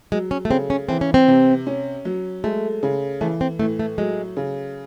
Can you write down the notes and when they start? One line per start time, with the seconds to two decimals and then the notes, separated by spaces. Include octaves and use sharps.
0.12 F#3 G#3
0.31 C#4
0.45 A3
0.50 C#3 C4
0.70 C#4
0.89 E3 C4
1.01 C#4
1.14 C4
1.28 C3
1.67 C#4
2.05 F#3
2.44 G#3 A3
2.83 C#3
3.21 E3 A3
3.41 C4
3.59 A2 A3
3.79 A3
3.98 F#3 G#3
4.37 C#3